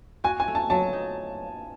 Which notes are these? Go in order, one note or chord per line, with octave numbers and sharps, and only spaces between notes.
F#4 G#5
G#5
A3
A5
F#3 A5
D#4